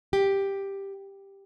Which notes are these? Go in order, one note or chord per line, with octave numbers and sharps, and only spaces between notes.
G4